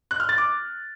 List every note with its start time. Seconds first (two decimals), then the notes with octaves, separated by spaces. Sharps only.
0.11 F#6
0.20 F6
0.29 A6
0.38 D6